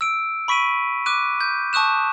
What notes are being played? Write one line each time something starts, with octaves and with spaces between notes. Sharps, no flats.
E6 D7
B5 C#6 B6 D7 D#7
D6 F#6 D#7
G6
A5 C#6 D#6 F#6 E7